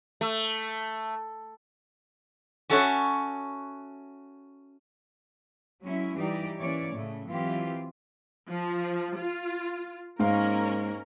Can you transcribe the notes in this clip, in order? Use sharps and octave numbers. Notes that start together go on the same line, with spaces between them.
A3
C#4 F#4 A4 C#5 E5 F#5
F#3 G#3 C#4 E4
E3 G3 D#4 G4 D5
E3 A#3 C#4 C#5 D5
A2 C#3 A3
E3 F#3 C4 F4 G4
F3
F4
G#2 A#3 C#4 A#4 F5